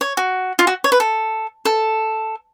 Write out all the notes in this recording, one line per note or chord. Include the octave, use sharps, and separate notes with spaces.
C#5
F#4
F4
F#4
C#5
B4
A4
A4